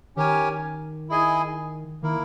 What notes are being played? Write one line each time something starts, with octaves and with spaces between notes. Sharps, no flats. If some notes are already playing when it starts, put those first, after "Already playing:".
D#3 C#4 G4 A#4 C#5 G#5
E4 G#4 D#5 G#5
D#3 A#3 E4 A#4